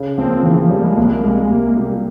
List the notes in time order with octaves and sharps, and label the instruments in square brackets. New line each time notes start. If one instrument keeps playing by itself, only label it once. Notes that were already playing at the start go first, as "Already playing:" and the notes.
Already playing: [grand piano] C#3
[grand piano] F3 A#3 [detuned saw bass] C4
[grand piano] C#3 [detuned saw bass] E3
[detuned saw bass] F3
[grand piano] F3 A#3 [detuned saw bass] G3
[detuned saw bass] G#3
[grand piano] C2 [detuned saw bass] A#3
[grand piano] C3 G3 A#3 [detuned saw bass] G#3
[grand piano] C2 [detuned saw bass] A#3
[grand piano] C3 G3 A#3